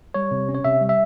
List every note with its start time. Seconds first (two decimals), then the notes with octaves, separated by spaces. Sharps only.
0.14 G3 C#5
0.31 C3
0.49 C#4
0.55 C#5
0.64 C3 E5
0.81 G3
0.89 E5